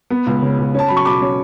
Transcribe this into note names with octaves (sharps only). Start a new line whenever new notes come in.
B3
C#2
C#3
C#2
C#4 A5
F#3 B5
C#6
B2 B5 D6
C#4